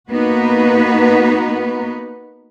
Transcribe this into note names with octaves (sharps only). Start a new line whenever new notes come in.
A#3 B3 D#4 F#4 B4